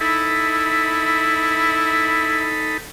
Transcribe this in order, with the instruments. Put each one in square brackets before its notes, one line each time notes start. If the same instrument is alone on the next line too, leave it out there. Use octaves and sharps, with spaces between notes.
[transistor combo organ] D#4 A4 B5 [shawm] E4